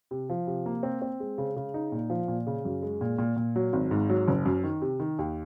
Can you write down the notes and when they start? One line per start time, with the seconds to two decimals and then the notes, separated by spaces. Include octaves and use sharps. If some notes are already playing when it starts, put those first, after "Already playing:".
0.11 C3
0.29 F3
0.47 C3
0.66 A#3
0.83 C4
1.02 C4
1.20 G#3
1.38 C#3
1.56 C#3
1.74 D#4
1.92 A#2
2.10 F3
2.28 A#2
2.47 C#3
2.65 F#2
2.82 G#3
3.01 A#2
3.18 A#2
3.37 A#2
3.56 F#3
3.73 G#1
3.91 G#2
4.10 F#3
4.28 F#1
4.46 F#2
4.64 D#3
4.82 C3
5.00 D#3
5.19 D#2